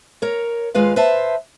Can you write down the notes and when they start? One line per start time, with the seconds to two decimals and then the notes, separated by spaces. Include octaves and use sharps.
0.22 A#4 C#5
0.75 D#2 G#3 F4 B4 F5
0.96 B4 C5 E5 A5